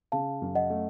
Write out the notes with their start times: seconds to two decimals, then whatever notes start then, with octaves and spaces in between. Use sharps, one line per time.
0.12 C#3 F5 A5
0.42 F#2
0.55 D#5 F#5
0.70 A3